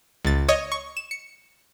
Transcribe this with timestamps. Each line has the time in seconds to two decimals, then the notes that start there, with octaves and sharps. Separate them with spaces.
0.25 C#2 A6
0.48 C#5 D#5 A#6
0.72 C#6
0.97 E7
1.11 C#7